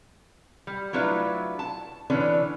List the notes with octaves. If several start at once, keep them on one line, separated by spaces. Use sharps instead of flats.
G3
F#3 A3 D4 E4 F4 B4
A5
D3 E3 C#4 D4 B4